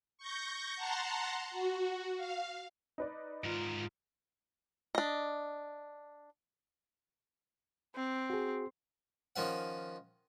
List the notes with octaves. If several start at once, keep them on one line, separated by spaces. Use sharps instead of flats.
C#6 G6 A#6
F#5 A5 A#5 C6
F#4
F5
D#4 B4 D5
G#2 F4 A#4
D4 D#5
C4
F#4 G#4
D#3 F3 C#4 F#5